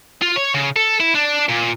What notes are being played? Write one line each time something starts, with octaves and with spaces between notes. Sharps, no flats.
F4
C#5
C#3
A4
E4
D4
A#2